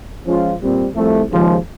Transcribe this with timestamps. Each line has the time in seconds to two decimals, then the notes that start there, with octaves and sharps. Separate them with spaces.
0.26 F3 G#3 C#4 F4
0.60 A#2 G3 C4
0.95 C2 C3 F3 A3
1.30 D#2 C#3 F3 G#3